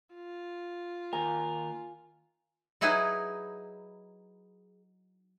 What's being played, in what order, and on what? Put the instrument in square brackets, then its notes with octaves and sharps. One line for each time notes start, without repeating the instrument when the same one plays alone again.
[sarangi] F4
[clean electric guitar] D#2 A#4 [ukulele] G#5
[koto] F#3 D#4 E4 G#4 B4 D#5